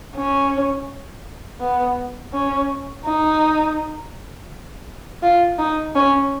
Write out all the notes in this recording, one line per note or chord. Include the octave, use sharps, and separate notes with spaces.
C#4
B3
C#4
D#4
F4
D#4
C#4